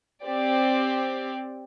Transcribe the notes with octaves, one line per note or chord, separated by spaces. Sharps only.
C4 G4 D5